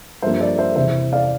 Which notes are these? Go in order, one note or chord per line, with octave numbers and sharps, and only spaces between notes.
G2 F3 A#3 D4 C5 E5
D5
C5 E5
E2 C3 E3 C5 E5
D5 F5